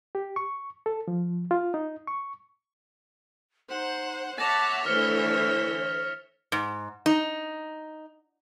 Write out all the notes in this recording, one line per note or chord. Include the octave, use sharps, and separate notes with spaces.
G4
C#6
A4
F3
F4
D#4
C#6
D#4 C5 F#5
C#5 E5 F#5 A5 D6 A6 A#6 F7
D3 E3 A3 C5 F6 C#7 G7
G#2
D#4